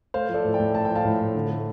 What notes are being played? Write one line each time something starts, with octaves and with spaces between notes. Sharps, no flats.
A3 C5 F5
F3
A4 D5
A2
D5 G5
A2
A3 A5
F3 G5
F5 A5
A2
A2
D3
A3